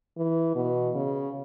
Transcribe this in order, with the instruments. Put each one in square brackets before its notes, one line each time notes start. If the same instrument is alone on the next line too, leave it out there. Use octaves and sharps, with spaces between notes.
[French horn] E3
B2
C#3